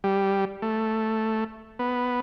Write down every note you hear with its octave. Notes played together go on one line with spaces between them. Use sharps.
G3
A3
B3